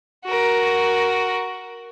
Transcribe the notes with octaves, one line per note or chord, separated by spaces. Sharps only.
F#4 A#4